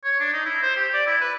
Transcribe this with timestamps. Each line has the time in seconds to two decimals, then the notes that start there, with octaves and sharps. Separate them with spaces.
0.04 C#5
0.20 D4
0.33 D#4
0.45 E4
0.62 C5
0.77 G4
0.93 D5
1.06 E4
1.21 B4